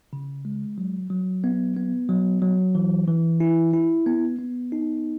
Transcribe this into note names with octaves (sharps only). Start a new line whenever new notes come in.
C#3
G#3
F#3
F#3
B3
B3
F#3
F#3
E3
E3
E4
E4
B3
B3
D#4